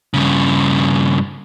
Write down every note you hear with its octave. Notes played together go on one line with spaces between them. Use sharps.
G2 C#3